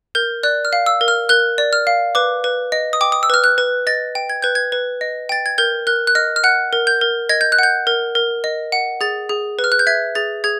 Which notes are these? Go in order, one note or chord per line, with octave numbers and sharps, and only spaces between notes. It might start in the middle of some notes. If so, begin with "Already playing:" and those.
A#4 G6
D5 F#6
F6
F5
E6
A#4
F6
A#4 F#6
D5
F6
F5
B4 D6
B4
D#5
D#6
G5 D6
D#6
E6
B4 F6
F#6
B4
D#5 A6
G5
G#6
B4 G6
G#6
B4
D#5
G5 A6
G#6
A#4 G6
A#4 F#6
F#6
D#5 F6
F6
F#5 F#6
A#4
G6
A#4
D#5 G#6
G6
F#6
F#5 G6
A#4
A#4
D#5
F#5
G#4 A6
G#4
B4
F6
F#6
G6
E5 G#6
G#4 A6
G#4 G#6